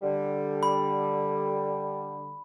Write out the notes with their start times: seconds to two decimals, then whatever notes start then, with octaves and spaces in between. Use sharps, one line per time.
0.03 D3 G3
0.63 B5